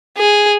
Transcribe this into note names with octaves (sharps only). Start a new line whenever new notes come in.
G#4